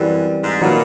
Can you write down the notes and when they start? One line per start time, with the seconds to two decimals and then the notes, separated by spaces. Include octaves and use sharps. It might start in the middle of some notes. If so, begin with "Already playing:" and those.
Already playing: F#2 E3 G3 C4
0.42 G#2
0.61 A#2 D#3 F#3 B3